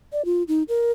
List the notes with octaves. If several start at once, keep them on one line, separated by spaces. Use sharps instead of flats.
D5
F4
D#4
A#4